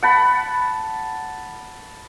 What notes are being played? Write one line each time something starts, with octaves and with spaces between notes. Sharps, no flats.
F#5 A5 B5